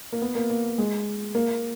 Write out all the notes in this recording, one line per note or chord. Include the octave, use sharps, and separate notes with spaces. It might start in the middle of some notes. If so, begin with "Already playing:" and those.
A#3
B3
A#3
A#3
G#3
A#3